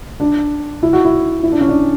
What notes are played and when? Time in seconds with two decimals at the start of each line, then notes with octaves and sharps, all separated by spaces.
0.20 D4
0.83 E4
0.93 F#4
1.05 E4
1.43 E4
1.52 D4
1.61 C#4
1.69 D4